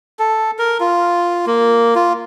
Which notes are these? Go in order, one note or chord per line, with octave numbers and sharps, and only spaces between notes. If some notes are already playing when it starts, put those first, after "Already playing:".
A4
A#4
F4
A#3
F4